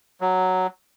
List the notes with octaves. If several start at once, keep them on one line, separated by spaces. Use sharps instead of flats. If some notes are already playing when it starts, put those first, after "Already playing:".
F#3